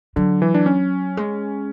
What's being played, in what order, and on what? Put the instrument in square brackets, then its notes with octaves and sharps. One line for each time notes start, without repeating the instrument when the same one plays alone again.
[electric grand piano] D3 [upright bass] F#3
[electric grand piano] E3
D4
C#4
[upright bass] G#3